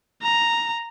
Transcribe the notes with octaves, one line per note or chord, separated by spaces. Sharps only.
A#5